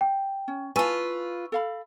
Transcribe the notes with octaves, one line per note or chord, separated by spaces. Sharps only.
G5
C#4
E4 F4 B4 G#5 A5 C#6 E6
A4 F5 B5